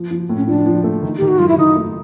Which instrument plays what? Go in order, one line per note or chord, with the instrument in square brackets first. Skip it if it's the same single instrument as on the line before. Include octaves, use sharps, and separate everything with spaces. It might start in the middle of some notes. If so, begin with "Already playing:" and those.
Already playing: [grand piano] F3
F3
A2
[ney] C#4
[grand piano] F3 [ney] D4
[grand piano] F3
A3
D#3
[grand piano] D#3 [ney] G4
[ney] F#4
[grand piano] F#2 [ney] F4
[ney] E4
[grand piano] D#3 [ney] D#4
[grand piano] A3